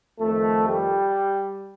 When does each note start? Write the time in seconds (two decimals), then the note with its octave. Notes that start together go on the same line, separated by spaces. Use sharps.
0.19 F2 D#3 A3
0.68 G3